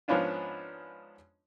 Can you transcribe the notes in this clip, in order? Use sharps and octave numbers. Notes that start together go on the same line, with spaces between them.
G#2 F3 B3 C#4 D4 F4